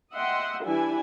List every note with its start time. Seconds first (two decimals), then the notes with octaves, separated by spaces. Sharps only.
0.13 D#5 E5 F#5 G5 C6
0.64 E3 G3 D4 E4 G#5